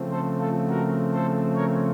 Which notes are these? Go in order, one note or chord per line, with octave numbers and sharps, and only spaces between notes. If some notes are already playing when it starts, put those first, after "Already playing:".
Already playing: C#3 F3 A3 C4
A4 C5
F4 A4
F#4 A#4
A4 C5
A#4 C#5